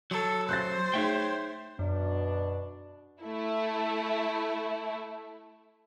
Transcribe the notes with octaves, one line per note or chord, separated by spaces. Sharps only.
F#3 A4
C5 F#6 G6 A6
A3 D#4 G#4 C#5 E5 G5
F#2 B2 D4
A3 E4